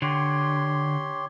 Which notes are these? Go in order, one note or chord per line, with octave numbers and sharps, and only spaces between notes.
D3 G4 C#5 C6